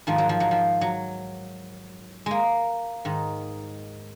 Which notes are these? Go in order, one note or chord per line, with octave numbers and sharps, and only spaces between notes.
G#2 D#3 F3
F#3
F3
F#3
F3
F#3
G#3 A#3
G#2 D#3